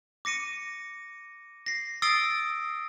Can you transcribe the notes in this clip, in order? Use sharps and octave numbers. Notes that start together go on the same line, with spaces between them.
D6 A#6 C#7 D#7
A#6 C7
D#6 E6 A6 C7 D7 G7